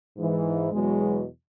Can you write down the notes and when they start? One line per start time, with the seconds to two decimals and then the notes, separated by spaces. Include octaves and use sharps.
0.17 G#2 E3
0.73 E2 B2 F#3 G#3